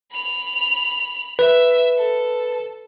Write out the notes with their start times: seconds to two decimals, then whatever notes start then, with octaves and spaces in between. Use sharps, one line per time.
0.12 B5 F7
1.39 B4 E5 B6
1.98 A4